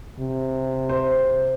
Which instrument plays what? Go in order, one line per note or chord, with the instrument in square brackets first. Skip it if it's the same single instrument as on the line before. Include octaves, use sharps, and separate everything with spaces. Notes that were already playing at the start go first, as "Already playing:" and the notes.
[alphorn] C3
[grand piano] C5